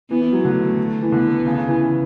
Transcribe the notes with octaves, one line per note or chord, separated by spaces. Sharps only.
E3 B3
E3
F#3
D3 A3
E3
D3 B3
C#3
C#3
E3